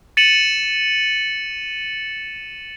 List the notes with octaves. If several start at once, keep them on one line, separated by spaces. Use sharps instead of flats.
A6 C#7 D#7 E7 F#7